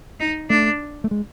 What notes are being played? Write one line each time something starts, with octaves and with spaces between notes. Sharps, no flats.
D#4
A3 D4
A3
G#3